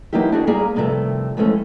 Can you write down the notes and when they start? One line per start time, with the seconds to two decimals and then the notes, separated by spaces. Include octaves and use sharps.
0.13 E3 F#3 A#3 D#4 E4 G4
0.32 D4 F#4 G#4
0.47 G3 A#3 G#4 G#5 A#5
0.76 G2 C3 D#3 F3 G#3 A3
1.37 D#2 E3 F3 G#3 A3 C#4